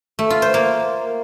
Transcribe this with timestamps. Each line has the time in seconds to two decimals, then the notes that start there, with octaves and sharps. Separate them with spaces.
0.19 A3
0.30 F4
0.42 C5
0.54 A#3